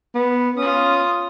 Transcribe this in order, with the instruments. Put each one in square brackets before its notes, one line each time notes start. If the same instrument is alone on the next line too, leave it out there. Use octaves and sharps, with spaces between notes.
[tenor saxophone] B3
[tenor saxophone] C#4 [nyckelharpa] F4 D#6